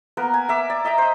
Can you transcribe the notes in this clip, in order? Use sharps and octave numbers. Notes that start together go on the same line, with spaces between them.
A#3 B3 A#4 B4
G#5
A#4 E5 D6
D5
D#5 E5 G5 A#5
C5 D#5